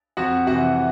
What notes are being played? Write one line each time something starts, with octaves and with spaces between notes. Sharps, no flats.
F2 F#4 F#5
C3 E3 F#4 F#5